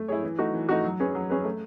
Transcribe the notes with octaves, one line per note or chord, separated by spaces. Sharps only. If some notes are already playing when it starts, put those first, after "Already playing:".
Already playing: A3
E4 G#4 C#5
E3
A3 D#4 F#4
E3
A3 D#4 F#4
F#3
C#4 G#4 B4
F#3
C#4 G#4 B4
A3